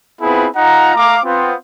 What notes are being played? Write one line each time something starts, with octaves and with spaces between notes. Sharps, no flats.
B3 C4 E4 F4 G#4 B4
D#4 F4 F#5 A#5
A3 F5 A#5 D6
B3 C4 F4